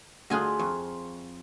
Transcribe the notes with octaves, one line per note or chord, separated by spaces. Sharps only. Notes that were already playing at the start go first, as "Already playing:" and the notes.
D2 F4 G#4 D#5 F#6
F2 C#6